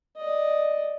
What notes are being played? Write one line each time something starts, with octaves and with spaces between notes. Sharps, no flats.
D5 D#5